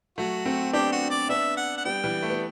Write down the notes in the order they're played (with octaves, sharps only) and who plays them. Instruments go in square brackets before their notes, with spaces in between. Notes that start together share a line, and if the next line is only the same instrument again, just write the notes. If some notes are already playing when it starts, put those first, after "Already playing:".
[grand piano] F#3 A3 [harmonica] F#4
[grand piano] A3 C4
[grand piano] B3 D4 [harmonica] G4
[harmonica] F#4
D5
[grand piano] B3 D4 [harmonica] E5
[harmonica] F#5
F#5
[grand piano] G3 B3 [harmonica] G5
[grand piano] E3 G3
A3
B3